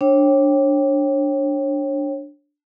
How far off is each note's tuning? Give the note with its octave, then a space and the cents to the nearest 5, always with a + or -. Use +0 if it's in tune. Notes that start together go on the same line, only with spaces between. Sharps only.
D4 +0 C#5 -30 G5 +0